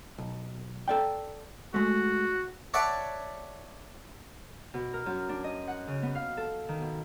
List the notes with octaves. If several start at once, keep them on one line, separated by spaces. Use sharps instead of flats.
B1
A4 D5 G5
G#3 A3 F#4
C#5 D5 E5 F#5 A5 C#6
B2
A#4
F#2
D4
D#5
F#5
C#3
B3
F5
A4
D#3
B2